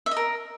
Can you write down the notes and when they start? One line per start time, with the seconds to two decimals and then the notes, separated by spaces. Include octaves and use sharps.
0.06 E5
0.11 D#5
0.17 A#4